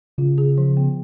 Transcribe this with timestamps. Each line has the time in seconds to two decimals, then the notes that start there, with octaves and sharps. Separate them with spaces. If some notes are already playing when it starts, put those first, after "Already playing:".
0.18 C#3 F4
0.38 G#4
0.58 F3
0.77 B3